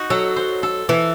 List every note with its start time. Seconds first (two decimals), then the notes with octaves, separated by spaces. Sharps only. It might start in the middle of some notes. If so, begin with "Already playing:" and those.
Already playing: D#4 F#4
0.10 F#3 A4
0.36 C5
0.63 A4
0.89 E3 A4